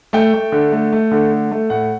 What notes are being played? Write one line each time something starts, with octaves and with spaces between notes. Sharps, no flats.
A3 G5
A3
D3
A3
A3
D3
A3
A3
A2 F#5